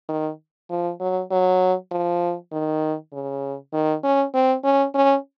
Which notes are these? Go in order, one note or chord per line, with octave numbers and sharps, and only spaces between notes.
D#3
F3
F#3
F#3
F3
D#3
C#3
D#3
C#4
C4
C#4
C#4